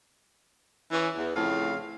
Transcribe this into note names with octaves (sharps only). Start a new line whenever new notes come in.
E3 C#4
E2
F2 A2 C#3 F5